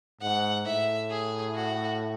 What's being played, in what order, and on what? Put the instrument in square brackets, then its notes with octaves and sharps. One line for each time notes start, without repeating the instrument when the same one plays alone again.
[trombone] G#2 [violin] F#5
[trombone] A2 [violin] E5
[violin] G#4
F#4